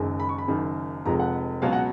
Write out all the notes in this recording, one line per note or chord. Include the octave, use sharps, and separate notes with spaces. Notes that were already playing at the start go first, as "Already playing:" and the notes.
Already playing: F#1 F#2 D#3 G#3
B5
C#6
B5
F#1 F#2 D#3
F1 F2 F3 G#3 A#5
F#5
C#2 B2 F#3 F5
F#5